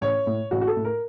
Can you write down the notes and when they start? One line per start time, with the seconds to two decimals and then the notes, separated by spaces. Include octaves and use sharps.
0.01 A1 C#5
0.26 A2
0.51 A1 F#4
0.61 F#4
0.67 A4
0.76 A2
0.85 A#4